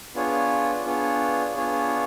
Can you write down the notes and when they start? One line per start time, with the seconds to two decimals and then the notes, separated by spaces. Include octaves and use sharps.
0.14 B3 D4 F4 G#4 C#5
0.86 B3 D4 F4 G#4 C#5
1.56 B3 D4 F4 G#4 C#5